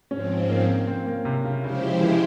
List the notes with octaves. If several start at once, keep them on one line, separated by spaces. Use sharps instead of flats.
G#2 F3 C4 C#4
A#3
C4
A#3
C3
C#3
C#3 F3 G#3 E4 G4 C5
E3